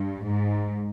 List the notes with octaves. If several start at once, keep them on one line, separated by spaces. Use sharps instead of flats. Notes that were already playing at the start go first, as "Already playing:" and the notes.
Already playing: G2
G#2